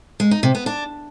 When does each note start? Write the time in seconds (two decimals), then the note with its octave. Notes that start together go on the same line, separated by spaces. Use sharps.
0.20 G#3
0.31 D#4
0.43 C3
0.55 B3
0.66 D4